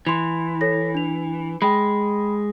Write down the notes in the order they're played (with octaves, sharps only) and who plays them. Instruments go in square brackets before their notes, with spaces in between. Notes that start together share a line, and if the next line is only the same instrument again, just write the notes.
[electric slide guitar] E3 [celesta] C6 F7
[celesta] A4 C#5 A#6
D4 F7
[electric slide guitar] G#3 [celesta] G5 B5